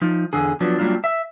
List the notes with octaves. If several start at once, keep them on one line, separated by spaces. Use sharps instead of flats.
F3 D#4
E2 D3 G#4
F3 F#3 B3 D4
F#3 G3 A#3 D4 F4
E5